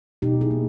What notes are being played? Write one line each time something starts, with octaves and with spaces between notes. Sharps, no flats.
B2 D#4 G4
E4 G#4
A#3